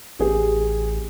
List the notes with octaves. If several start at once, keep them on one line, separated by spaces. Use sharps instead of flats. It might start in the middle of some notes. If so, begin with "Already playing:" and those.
A1 G4 G#4